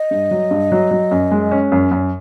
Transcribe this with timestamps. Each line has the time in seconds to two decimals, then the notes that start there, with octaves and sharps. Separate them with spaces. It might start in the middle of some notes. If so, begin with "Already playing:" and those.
Already playing: D#5
0.11 G2
0.31 F#3
0.51 G2
0.72 F#3
0.91 F#3
1.11 F#2
1.31 G#3
1.51 C#4
1.72 F#2
1.91 F#2